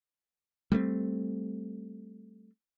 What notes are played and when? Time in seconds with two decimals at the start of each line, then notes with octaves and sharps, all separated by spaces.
0.72 G3 A3 A#3 C4